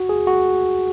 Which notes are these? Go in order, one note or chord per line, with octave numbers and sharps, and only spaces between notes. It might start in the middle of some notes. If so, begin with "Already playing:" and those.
Already playing: F#4
G#4
F#4